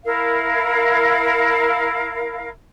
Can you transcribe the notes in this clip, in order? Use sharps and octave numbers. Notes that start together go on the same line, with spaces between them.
E4 A#4 F5